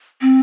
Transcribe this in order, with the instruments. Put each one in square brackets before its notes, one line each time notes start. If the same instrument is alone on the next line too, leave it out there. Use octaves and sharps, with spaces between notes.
[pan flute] C4